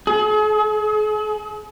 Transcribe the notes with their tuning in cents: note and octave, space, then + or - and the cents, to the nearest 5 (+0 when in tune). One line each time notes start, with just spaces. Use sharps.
G#4 +45